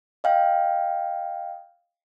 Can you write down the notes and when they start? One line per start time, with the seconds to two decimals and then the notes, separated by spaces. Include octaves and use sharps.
0.24 D#5 F5 G5